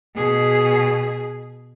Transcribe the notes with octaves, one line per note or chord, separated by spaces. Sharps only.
B2 G#4